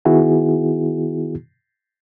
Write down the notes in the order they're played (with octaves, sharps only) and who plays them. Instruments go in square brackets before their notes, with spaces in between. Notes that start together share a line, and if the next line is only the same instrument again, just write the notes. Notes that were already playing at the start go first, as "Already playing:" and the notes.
[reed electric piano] D#3 B3 E4 F#4 G#4